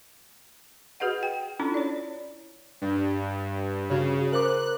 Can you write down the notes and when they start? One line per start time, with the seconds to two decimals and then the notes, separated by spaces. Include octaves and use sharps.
1.00 F#4 G#4 B4 D#5 F#5
1.23 G5
1.59 C#4 D4 E4 F4 A4
1.74 C#5 D5
2.82 G2
3.90 C#3 F#4 C#5
4.32 A#4 C5 D6 F#6